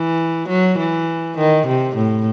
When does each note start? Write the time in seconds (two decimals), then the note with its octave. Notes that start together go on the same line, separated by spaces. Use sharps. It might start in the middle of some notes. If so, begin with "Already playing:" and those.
Already playing: E3
0.48 F#3
0.79 E3
1.37 D#3
1.67 C3
1.95 A2